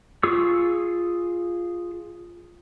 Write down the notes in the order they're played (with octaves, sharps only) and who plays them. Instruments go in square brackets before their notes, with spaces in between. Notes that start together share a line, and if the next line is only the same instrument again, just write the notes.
[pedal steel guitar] F4 G#4 C#6 E6